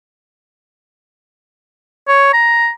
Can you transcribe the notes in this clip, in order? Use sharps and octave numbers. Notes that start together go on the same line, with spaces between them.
C#5
A#5